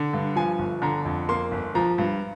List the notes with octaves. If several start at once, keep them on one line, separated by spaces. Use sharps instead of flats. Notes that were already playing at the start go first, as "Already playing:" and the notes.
Already playing: D3
G2
F3 G#5
G1
D3 A#5
F2
A#3 C6
G1
F3 A#5
G2